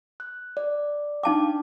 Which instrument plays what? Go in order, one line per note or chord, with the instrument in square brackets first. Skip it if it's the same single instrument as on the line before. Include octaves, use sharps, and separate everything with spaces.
[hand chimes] F#6
D5
[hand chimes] D4 F5 G5 [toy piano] D#4 A5 D6